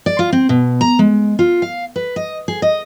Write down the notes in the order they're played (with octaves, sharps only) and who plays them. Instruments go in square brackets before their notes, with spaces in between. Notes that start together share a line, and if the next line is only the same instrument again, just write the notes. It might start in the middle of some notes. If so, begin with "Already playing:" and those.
[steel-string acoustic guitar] D5
F4
C4
B2
A#5
G#3
F4
F5
B4
D#5
G#4
D#5